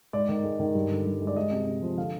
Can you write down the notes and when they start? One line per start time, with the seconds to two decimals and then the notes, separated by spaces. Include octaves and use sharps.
0.13 G#2 D5
0.29 D#3
0.44 G#3
0.60 D#3
0.75 G2
0.90 D3
1.06 G2
1.22 G#3
1.27 D5
1.36 G#3 D#5
1.52 C3
1.67 C3
1.83 F3
1.97 D3 F5